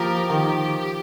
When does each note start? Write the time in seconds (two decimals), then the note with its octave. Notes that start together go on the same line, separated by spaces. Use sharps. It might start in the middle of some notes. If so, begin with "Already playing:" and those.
Already playing: F3 A#3 G4 A#4
0.29 D#3 G4